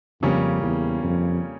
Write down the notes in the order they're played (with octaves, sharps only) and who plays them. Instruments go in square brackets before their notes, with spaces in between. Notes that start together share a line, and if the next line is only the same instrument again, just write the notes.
[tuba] F2 [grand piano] C#3 G3 A#3 C#4
[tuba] E2
F2